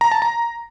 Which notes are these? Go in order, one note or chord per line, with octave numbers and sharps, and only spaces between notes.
A#5
A5
A#5